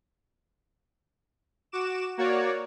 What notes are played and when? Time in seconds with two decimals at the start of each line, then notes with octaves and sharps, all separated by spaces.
1.72 F#4 D6 E7
2.18 A#3 F#4 C#5 D5